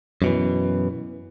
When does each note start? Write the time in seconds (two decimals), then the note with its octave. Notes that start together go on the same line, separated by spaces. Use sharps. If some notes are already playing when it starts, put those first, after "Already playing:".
0.22 F#2 B2 E3